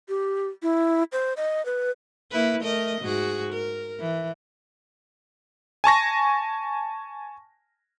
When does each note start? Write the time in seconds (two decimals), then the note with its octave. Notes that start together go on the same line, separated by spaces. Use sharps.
0.09 G4
0.63 E4
1.12 C5
1.37 D#5
1.66 B4
2.32 A#3 E4 B4
2.61 A3 A#4 D#5
3.01 G#2 F#4 G#4
3.53 A#4
4.00 E3
5.84 G#5 A5 C#6 A#6